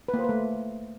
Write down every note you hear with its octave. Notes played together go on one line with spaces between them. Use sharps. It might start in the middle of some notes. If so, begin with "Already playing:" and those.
B4
A#3
C5
B4
A3